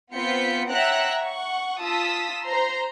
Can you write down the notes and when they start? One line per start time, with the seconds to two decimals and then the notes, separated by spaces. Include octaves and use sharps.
0.14 B3 C4 F4 G6 B6 C#7
0.68 C#5 E5 F#5 G5 A#5 F#6
1.22 F#5 C#6
1.80 F4 A5 D#6 E6 B6
2.45 C5 A#5 C6